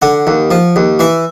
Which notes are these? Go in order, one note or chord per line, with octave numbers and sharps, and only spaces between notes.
D3 F#5
D#2
F3
D#2
E3 E5